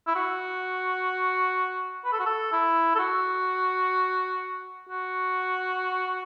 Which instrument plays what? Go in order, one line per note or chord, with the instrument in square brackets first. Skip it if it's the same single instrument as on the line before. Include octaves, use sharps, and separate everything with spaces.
[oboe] E4
F#4
B4
A4
F#4
A4
E4
A4
F#4
F#4